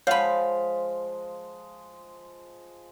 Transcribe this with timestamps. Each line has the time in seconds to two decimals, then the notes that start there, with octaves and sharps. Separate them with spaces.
0.07 F3 G#3 C#5 F5 F#5 A5 B5